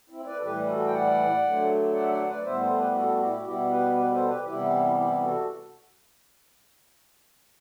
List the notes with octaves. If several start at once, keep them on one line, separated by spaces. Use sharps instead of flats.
C4 E4
B4 D5
A4
A2 E3 G3 G4 B4
F#4 A4
G5
D5 F#5
D3 F#3 A3
D5 F#5
E5
D5 F#5
B4 D5
A2 G3 B3 C5 E5
A4 C5
G4 B4
F#4 A4
F#4
E4 G4
F#4
B2 G3 B3 E4 G4
G4 B4
G4 B4
A4 C5
G4 B4
C3 E3 G3 B3 E4 G4
E4 G4
F#4 A4